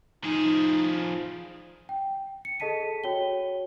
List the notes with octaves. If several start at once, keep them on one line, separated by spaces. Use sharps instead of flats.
F3 D#4 G#4
G5
C#7
G#4 A4 D#5 A5 B6 D#7
F#4 C#5 G5 G7